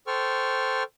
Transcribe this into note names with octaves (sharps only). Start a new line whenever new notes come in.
A4 C5 G5 C#6 F6